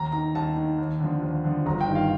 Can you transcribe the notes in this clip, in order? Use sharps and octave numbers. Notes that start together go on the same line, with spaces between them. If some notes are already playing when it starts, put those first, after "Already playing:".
Already playing: D#2 A#5
D#3 A#5
D#2 A5
D#3
D#2
D3 F3
D#2
D3 F3
G1 A#5
G5
G2 D#3
F5